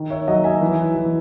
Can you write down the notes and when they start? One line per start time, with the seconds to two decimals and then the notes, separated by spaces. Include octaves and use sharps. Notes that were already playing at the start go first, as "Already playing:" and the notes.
Already playing: D#3
0.10 C#5 E5
0.27 F#3 D#5 F#5
0.44 E5 G#5
0.62 E3
0.95 E3